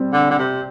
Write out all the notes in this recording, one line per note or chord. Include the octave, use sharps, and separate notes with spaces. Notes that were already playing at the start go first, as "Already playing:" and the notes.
Already playing: G3 C4
D3
D3
C3